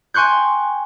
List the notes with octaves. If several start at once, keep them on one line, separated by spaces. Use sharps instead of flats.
G5 G#5 C6 C#6 F#6 G6